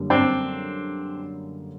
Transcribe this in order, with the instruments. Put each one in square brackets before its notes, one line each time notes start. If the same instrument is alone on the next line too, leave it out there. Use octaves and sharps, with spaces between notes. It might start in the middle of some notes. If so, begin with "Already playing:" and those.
Already playing: [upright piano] F#2 D3 G3 A#3
[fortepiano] C4 D4